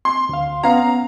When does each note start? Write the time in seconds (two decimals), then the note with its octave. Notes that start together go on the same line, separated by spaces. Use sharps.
0.05 C6
0.29 D2 F5
0.63 B3 C#4 F5 F#5 A#5